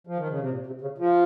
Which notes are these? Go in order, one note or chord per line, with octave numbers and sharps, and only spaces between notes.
F3
D#3
C#3
C3
A#2
C3
C#3
F3